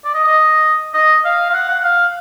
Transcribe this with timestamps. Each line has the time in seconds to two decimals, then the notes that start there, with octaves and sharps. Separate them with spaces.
0.05 D5
0.14 D#5
0.25 D#5
0.94 D#5
1.25 F5
1.50 F5
1.54 F#5
1.69 F#5
1.80 F#5
1.84 F5